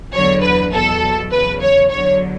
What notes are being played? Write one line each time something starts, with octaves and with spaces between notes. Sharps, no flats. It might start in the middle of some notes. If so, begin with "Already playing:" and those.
E2 D3 F#3 C#5
B4
E2 B2 F#3 A4
E2 C#3 F#3 B4
C#5
E2 D3 F#3 C#5